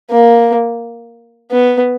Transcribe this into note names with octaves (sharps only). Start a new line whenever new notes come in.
A#3
B3